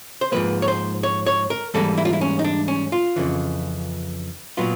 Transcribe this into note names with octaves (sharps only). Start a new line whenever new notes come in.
C5
G#2 F3 A#3 B4
C#5
C5
C#5
C#5
A#4
G#2 E3 G3 A#3 A4
E4
F4
E4
C#4
D#4
D4
C#4
F4
F2 C#3 E3
A#2 F#3 B3 F4